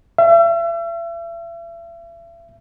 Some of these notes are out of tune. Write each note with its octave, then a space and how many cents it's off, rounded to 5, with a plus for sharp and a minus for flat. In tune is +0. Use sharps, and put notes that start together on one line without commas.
E5 +40